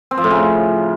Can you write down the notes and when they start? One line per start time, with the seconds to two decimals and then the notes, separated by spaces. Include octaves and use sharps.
0.11 C4
0.18 F3
0.24 A2
0.30 C#3